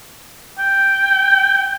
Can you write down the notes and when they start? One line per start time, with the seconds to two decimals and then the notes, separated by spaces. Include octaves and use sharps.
0.58 G5